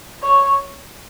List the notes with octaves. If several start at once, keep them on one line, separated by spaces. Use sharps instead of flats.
C#5